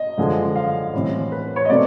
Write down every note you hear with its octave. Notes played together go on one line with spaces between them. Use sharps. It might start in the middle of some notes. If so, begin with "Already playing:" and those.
Already playing: D#5
F#2 D3 F3 G#3
F5
A2 E3 G3 C4
B4
C#5
D#5
B2 F#3 A3 C4 D5